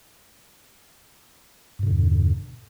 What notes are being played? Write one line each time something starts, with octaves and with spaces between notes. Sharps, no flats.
E2 G2 B2 D3